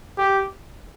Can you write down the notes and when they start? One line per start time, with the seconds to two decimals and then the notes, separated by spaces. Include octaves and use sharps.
0.17 G4